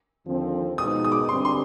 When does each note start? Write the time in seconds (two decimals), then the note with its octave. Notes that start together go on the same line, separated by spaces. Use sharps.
0.27 D#2 D3 F3 C4
0.78 B2 G#3 B3 D#4 D#6
1.04 D#6
1.12 D6
1.29 G2 D3 G3 C4 C6
1.45 C6